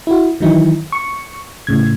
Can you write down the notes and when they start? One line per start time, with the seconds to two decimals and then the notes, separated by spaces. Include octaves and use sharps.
0.07 E4 F#4
0.40 D#3 E3 F#3 D#4 E4
0.92 C#6
1.67 A2 C#3 G#6